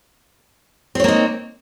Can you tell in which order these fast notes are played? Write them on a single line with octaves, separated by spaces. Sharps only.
C4 C#5 A#3 D#4